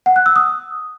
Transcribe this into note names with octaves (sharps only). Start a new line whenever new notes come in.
F#5
F#6
E6
D#6